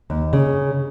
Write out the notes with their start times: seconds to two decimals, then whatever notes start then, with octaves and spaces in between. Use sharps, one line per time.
0.10 D#2
0.33 C#3